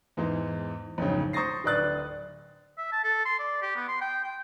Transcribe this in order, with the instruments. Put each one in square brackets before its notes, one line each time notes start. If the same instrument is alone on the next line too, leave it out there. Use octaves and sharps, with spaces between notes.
[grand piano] E2 G#2 E3 G#3
B1 F2 G#2 C#3
C5 C#6 D#6 A6 A#6 C7
D1 B4 D5 F#6 A6
[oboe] E5
A5
A4
C6
D5
G4
B3
C6
G5
G5